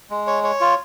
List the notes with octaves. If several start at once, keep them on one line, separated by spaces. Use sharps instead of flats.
G#3
C#5
C#5
F4